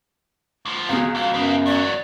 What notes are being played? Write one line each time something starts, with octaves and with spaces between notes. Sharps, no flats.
D2 F3
C#2 B2 G#4
F2 F5
F#2 B3 D#4
E2 F#3 D5